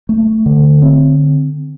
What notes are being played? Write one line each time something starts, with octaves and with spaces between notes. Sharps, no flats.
A3
D3
C4